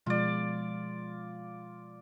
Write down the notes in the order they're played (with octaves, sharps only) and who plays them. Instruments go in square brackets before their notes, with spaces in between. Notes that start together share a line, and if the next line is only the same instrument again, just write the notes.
[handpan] B2 F3 G#3 [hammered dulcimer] F4 D5